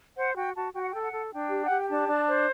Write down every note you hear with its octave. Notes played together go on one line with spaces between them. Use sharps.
C5 F#5
F#4 G5
F#4 A5
F#4 G5
F#5
A4 G5
F#5
A4
D4 G5
G4
F#5
G4
G5
D4 A5
D4
C5